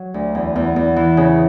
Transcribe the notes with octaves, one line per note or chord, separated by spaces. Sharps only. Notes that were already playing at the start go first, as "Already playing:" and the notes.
Already playing: F#3
D2
E2
E2
E2
E3
C#3